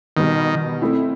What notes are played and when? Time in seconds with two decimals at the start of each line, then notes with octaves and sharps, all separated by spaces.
0.17 B2 D#3 G3 B3
0.82 A3 C4 E4